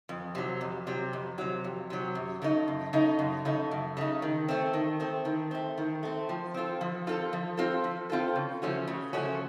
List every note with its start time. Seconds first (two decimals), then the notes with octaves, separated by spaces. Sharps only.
0.09 F2
0.35 C3 F#3
0.61 F2
0.87 C3 F#3
1.13 F2
1.38 C3 F#3
1.64 F2
1.90 C3 F#3
2.15 F#2
2.42 C#3 A3 D#4
2.68 F#2
2.93 C#3 A3 D#4
3.19 F#2
3.45 C#3 A3 D#4
3.71 F#2
3.97 C#3 A3 D#4
4.22 D#3
4.49 A3 C4
4.73 D#3
5.00 A3 C4
5.25 D#3
5.51 A3 C4
5.78 D#3
6.03 A3 C4
6.29 F3
6.54 C4 F4 A4
6.81 F3
7.07 C4 F4 A4
7.33 F3
7.57 C4 F4 A4
7.84 F3
8.10 C4 F4 A4
8.36 C#3
8.62 F3 A3 C#4 F#4
8.88 C#3
9.13 F3 A3 C#4 F#4